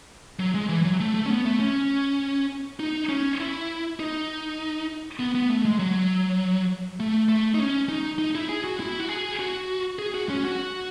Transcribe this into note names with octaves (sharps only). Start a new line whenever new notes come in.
F#3
G#3
E3
F#3
A3
A3
C#4
B3
A3
C#4
D#4
C#4
E4
D#4
B3
B3
A3
G#3
F#3
A3
A3
D#4
C#4
D#4
D#4
E4
G#4
F#4
E4
F#4
G#4
F#4
G#4
F#4
C#4
F#4